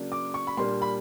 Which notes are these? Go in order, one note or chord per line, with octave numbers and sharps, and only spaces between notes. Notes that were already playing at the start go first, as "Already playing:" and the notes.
Already playing: C#3 F#3 A#3 D4
D6
C#6
B5
A#2 G3 A#3 D4 C6
B5